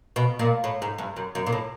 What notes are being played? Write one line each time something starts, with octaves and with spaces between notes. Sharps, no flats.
B2
A#2
A2
G#2
G2
F#2
F#2
A#2
A2